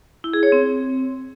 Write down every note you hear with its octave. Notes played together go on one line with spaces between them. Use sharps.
E4
G#4
C#5
C4